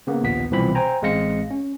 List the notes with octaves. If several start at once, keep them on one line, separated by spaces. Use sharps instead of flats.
C#3 A#3 B3
A#1 D#2 A#2 B3 B6
C2 B2 E3 F3 C4 B5
C5 G5 G#5 A#5
A1 G#3 C4 F5 A#6 C#7
C#4